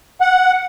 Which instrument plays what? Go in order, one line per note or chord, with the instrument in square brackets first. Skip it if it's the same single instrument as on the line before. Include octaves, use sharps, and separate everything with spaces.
[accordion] F#5